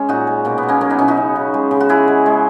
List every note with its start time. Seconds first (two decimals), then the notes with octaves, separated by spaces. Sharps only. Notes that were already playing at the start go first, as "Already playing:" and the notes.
Already playing: G#3 C#4
0.09 A#2 D#4 F#4
0.27 G#3
0.45 B2 A#3
0.58 B3
0.63 B2
0.69 A#3 C#4
0.81 F#3 A#3 C#4
0.90 B3 D#4
0.99 B2 C#4 E4
1.08 D#4 F#4
1.17 C#3
1.36 C#3
1.54 G#3
1.71 C#3
1.80 F#4
1.89 G#3 E4 G#4
2.08 G#3
2.26 G#3